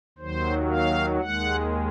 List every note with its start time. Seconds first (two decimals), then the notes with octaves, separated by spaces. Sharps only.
0.18 D#2 D#3 F#3 C5
0.69 F5
1.20 D#2 D#3 G#3 F#5